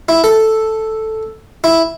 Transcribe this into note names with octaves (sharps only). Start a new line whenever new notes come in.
E4
A4
E4